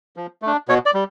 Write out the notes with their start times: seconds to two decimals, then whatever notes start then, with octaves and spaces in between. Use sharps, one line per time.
0.17 F3
0.42 A3 D4
0.68 B2 C#5
0.86 D5
0.94 G3